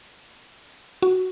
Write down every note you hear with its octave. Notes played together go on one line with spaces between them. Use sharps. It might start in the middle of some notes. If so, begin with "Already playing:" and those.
F#4